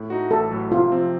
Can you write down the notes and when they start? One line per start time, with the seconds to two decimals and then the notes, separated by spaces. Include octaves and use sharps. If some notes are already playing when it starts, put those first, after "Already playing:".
Already playing: A2
0.10 A3 D#4 F#4
0.30 A1 A4
0.51 A2 F#3
0.72 C3 F4
0.92 F3 C4